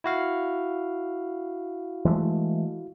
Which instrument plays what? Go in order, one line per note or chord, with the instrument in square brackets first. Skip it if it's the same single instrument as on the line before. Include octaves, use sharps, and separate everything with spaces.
[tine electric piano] E4 F#4 F5
[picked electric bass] E3 G#3 A3